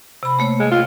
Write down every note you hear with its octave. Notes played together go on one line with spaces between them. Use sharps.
C3 B5
A3 A#3 C#5
G#3
F4